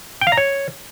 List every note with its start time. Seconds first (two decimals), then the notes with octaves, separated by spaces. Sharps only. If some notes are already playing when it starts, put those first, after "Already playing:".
0.21 G5
0.27 F5
0.32 A#5
0.37 C#5